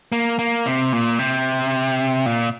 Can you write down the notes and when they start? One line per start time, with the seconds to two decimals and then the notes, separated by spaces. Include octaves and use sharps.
0.12 A#3
0.39 A#3
0.66 C3
0.93 A#2
1.19 C3
2.26 A#2